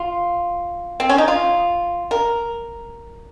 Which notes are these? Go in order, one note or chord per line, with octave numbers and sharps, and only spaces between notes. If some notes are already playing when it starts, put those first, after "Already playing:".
Already playing: F4
C4
C#4
D#4
F4
A#4